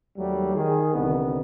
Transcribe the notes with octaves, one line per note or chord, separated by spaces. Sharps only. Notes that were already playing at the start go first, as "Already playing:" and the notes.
D#2 F#3 G3 A3
D#3 G#4
C2 D3 D#3 B3